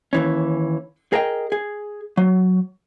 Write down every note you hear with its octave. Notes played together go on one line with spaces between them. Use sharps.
D#2 E3 C#4
G#4 A#4 D#5 G5
G#4
F#3